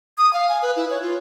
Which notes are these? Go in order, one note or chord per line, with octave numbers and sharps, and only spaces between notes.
D#6
F5
G#5
B4
E4
C#5
F4